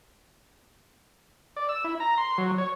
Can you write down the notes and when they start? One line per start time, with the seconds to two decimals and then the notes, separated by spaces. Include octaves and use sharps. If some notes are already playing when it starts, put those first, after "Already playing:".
1.57 D5
1.69 E6
1.84 E4
2.00 A#5
2.18 C6
2.38 F#3
2.58 C#5